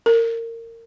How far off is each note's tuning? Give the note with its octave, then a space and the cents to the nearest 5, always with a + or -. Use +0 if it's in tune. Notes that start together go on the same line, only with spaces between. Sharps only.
A#4 -25